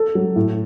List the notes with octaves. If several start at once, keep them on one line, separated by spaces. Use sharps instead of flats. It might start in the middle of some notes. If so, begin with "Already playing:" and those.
Already playing: A4
F#3
A2